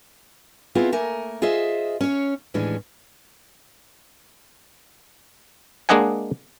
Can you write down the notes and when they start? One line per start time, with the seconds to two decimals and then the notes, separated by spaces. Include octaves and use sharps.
0.75 B3 C4 E4 F4 G#4
0.92 A3 A#3 A#4 G#5
1.42 F4 G#4 C5 D#5 E5
2.01 C#4 C#5
2.54 D#2 A2 E3 G#3 C#4 D4
5.89 G#3 A#3 D4 D#5 F#5 G#5